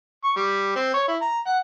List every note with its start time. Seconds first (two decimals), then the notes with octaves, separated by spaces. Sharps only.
0.24 C#6
0.36 G3
0.76 C4
0.94 C#5
1.08 E4
1.22 A#5
1.47 F#5